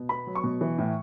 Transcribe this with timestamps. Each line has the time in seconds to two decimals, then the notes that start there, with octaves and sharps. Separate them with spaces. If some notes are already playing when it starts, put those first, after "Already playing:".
Already playing: B2
0.09 B3 B5
0.27 F#3
0.35 C#6
0.44 B2
0.61 E3
0.78 A2